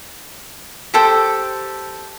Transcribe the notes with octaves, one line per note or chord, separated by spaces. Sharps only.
G4 A4 C5 G5